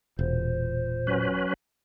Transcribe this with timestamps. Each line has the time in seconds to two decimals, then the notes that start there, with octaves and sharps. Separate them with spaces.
0.19 E1 A#2 C5
1.07 F#3 C#4 B4